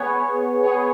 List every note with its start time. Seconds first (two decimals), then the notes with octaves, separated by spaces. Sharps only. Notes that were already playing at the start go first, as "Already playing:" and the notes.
Already playing: B3 G#4 C#5
0.62 B3 G#4 C#5